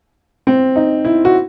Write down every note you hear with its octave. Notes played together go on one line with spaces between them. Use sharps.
C4
D#4
E4
F#4